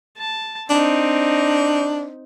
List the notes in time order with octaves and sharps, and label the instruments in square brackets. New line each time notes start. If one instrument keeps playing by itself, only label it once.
[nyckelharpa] A5
[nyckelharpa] C4 D#4 [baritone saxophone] D4